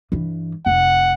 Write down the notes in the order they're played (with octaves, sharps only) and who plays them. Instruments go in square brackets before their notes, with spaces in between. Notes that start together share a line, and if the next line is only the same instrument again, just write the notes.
[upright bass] G2 E3
[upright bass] F1 [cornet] F#5